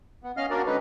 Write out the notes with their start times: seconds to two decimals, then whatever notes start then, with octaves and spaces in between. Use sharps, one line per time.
0.24 B3
0.37 C#4 D#5 F5 F6
0.50 A#3 C#4 D4 F#4 A#4 D5
0.66 D3 G#3 C#4 D#4 B4